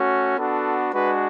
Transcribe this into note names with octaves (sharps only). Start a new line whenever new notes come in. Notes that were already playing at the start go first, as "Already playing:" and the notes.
Already playing: A3 C#4 F#4
B3 D4 F#4 A4
G#3 D4 F#4 B4